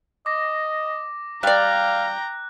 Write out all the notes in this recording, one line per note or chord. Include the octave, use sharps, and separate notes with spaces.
D#5 D6 A#6
G3 D5 F5 G5 A#5 F#6